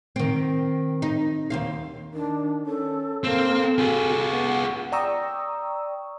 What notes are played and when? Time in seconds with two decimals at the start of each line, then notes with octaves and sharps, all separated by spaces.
0.16 D#3 C4
1.02 D#4
1.50 D#2 C4 F5
2.14 D#3 D4
2.66 C#4 A4
3.24 A#3 C4 A4
3.78 F4 F#4 G#4
4.32 B3 F#5
4.92 D5 G5 A#5 C#6 D#6 E6